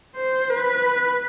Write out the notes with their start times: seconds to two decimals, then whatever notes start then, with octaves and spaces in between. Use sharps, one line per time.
0.16 C5
0.50 B4